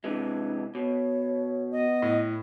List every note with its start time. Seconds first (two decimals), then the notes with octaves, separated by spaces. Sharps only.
0.04 C3 E3 G#3 D4
0.75 B2 C#5
1.73 B3 D#5
2.02 A2